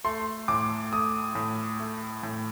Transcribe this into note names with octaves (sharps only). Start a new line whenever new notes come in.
A3 C6
A2 D6
A3 D#6
A2
A3
A2